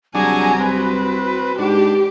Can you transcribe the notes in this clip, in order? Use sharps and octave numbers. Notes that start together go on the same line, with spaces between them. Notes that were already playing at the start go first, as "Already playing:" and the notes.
C2 F#3 D4 F#4 G#4 G#5 A#5
C4 B4
G#2 D4 G4